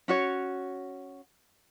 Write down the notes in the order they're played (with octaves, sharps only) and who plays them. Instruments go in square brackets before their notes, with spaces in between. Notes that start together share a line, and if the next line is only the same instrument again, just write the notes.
[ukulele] C#4 F#4 C#5